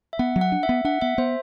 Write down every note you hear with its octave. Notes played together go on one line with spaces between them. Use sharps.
E5
B3 F#5
F#3
F#5
D4
E5
B3
D4 F#5
B3 E5
B3 C5